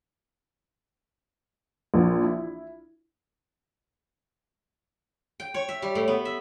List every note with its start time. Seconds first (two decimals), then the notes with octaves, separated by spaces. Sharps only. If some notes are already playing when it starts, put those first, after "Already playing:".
1.94 A#1
2.24 E4
5.40 G5
5.54 C#5
5.69 E5
5.82 G3
5.95 A2
6.08 B3
6.25 E5